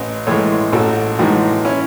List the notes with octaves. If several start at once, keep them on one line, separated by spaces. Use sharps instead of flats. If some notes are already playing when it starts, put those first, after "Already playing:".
Already playing: A1 B4 D#5
A2 E3 G#3 A4 C#5
A1 F#4 A4
A2 E3 G#3 D#4 F#4
C#4 E4